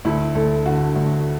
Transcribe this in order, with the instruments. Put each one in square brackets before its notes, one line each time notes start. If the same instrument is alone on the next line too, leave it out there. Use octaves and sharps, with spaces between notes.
[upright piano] D2 E4
D2 A4
D3 F#4
D2